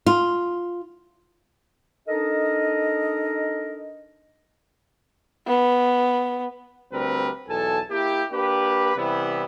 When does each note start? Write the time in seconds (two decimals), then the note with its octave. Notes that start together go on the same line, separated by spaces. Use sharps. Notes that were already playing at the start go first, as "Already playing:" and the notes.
0.06 F4
2.08 D4 D#4 A4 A#4 D#5
5.47 B3
6.93 D2 G3 C4 A#4 B4
7.49 B1 E2 A4 G#5 A5
7.91 A#3 E4 G4
8.32 A#3 D4 G4 B4
8.96 C3 E3 G3 B3 E4